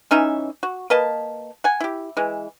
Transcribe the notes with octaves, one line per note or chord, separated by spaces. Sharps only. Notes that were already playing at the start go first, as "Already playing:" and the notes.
E3 C#4 D#4 E5
F#4
A#3 B4 D#5 A5
F#5 G#5
E4 G4
E3 G#3